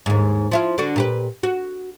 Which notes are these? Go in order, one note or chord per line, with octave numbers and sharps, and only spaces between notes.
D#2 G#2
F3 E4 F4
D3 D4 F#4
A#2 G4 B4
F#4